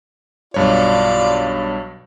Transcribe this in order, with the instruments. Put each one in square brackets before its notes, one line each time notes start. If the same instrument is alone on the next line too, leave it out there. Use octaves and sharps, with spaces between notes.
[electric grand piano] B1 G2 C#5 [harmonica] F4 D5